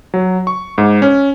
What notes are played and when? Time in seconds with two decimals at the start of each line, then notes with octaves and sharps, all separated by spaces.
0.14 F#3
0.47 C#6
0.78 G#2
1.02 C#4